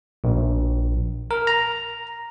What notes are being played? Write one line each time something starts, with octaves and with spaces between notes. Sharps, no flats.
A#1
A#4
A#5